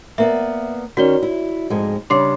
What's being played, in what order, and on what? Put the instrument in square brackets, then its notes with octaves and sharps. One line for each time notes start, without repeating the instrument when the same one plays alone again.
[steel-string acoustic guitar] A#3 B3 D5 [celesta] E5
[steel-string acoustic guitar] D#3 C#4 [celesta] F#4 D5 G7
[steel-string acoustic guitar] E4
F2 G#2 G#3
[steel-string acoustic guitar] C#3 G3 D4 [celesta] C6 D6 C7